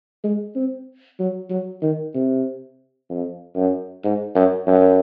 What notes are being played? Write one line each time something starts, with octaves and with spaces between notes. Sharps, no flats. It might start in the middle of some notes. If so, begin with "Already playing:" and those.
G#3
C4
F#3
F#3
D#3
C3
F2
F#2
G#2
F#2
F#2